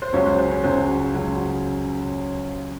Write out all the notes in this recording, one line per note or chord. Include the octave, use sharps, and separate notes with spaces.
C5
C#2 C#3 F#3 C#4 C#5
C5
C5
C#4 C#5
C#2 C#3 F#3 C5
C#2 C#3 F#3